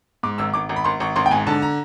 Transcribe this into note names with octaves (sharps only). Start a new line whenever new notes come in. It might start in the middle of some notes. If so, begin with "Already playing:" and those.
G#2 D6
G#1 E6
G#1 D6
G#1
B5
G#1 C6
G#1 C#6
G#1 C6
G5
G#2 G#5
D3 A5
A#5